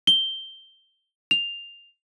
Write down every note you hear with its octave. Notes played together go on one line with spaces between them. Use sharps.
G7
F7